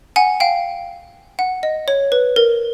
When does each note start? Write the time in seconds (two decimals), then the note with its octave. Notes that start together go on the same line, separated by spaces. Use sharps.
0.16 F#5 G#5
0.40 F5 G5
1.39 F#5
1.63 D#5
1.88 C#5
2.12 B4
2.36 A#4